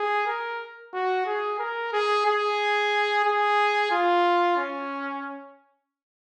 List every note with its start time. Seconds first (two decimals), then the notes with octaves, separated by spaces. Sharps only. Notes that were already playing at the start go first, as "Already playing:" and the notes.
Already playing: G#4
0.27 A#4
0.93 F#4
1.26 G#4
1.59 A#4
1.93 G#4
2.26 G#4
3.25 G#4
3.91 F4
4.57 C#4